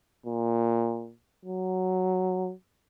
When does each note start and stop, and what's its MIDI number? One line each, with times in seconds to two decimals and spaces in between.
0.26 1.12 46
1.45 2.52 54